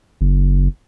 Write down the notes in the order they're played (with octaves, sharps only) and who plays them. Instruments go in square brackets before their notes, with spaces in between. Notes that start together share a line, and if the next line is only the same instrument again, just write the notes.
[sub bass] F#1